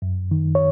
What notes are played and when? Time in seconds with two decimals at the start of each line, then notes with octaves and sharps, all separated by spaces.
0.02 F#2
0.31 D#3
0.55 C#5